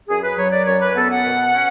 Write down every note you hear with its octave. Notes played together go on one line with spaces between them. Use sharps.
F#2 G#4
B4
F#3 C#5
D5
F#2 C#5
B4
B3 A4
F#5
B2
C#4